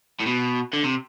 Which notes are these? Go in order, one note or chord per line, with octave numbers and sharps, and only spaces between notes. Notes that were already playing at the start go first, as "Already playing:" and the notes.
A2
B2
D3
C3